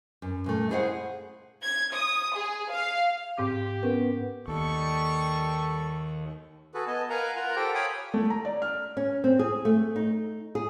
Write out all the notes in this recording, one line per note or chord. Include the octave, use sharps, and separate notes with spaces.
F#2
A#2 A3
E4 G#4 C5 D#5 F5 F#5
G#6
D#6
G#4
F5
G#2 C4 G4 D6
B3 C#4 A#4
D#2 G3 A4 C#6
F#4 G#4 A4 B4
B3 D#5 G#5 A5
A#4 B4 F5 F#5 G#5 A#5
F4 A#4 F#5 A#5
G4 A4 C5 G5
C#5 F5 G5 G#5 B5 D#6
A3
A#5
D5
F6
C#4
C4
G#4
A3
D#4
G#4